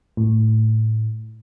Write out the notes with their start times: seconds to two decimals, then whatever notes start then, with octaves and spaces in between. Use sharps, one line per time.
0.17 A2